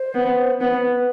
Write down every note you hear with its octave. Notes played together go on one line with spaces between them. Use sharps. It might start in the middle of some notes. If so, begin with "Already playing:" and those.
Already playing: C5
B3
B3 B4 C5